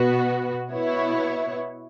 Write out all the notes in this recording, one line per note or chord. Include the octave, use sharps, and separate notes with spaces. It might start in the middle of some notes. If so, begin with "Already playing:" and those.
Already playing: B2 B3 F#4 B4
B2 B3 E4 C#5